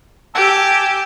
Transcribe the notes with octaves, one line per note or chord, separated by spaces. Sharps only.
G4 G#5 A5 E6